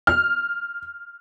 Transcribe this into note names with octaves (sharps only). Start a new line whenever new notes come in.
F6